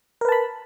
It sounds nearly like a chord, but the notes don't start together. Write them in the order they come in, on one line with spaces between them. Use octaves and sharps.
A#4 B4 A5 B5